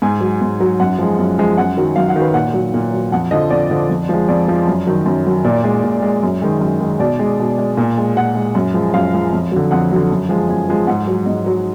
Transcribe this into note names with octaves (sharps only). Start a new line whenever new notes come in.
G#2 G#5
F#3
G#2
F#3
F#2 F#5
F3 G#3
F#2
F3 G#3
F#2 F#5
D#3 F#3
F#2 F5
F#5
D#3 F#3
B4
A#2 F#5
F#3
A#2
F#3
F2 F#5
D3 F3 D#5
F2 D5
D3 F3
F2
F3 G#3
F2 D5
F3 G#3
F#2
D#3 F#3
F#2
D#3 F#3
A#2 D5
G#3
A#2
G#3
F#2
D#3 G#3
F#2
D#3 G#3
B2 D5
G#3
B2
G#3
A#2
G#3
A#2 F#5
G#3
F#2
F3 G#3
F#2 F5
F3 G#3
F2
D3 F#3
F2 F#5
D3 F#3
F#2
F3 G#3
F#2 G#5
F3 G#3
G#2 F#5
F#3
G#2 D#5
F#3